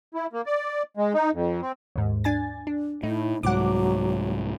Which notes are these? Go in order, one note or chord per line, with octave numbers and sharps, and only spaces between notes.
E4
A#3
D5
G#3
D#4
F2
C4
D#2 G#2
D4 G#5 A6
D4
A2 D#4 E4
C2 G#2 F#3 F#5 D6